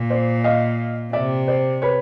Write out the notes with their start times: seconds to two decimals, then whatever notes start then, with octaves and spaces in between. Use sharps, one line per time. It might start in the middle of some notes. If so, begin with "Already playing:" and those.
Already playing: A#2
0.10 C5 D5
0.44 D#5 F5
1.13 C3 D5 E5
1.48 C5 D5
1.82 B4 C#5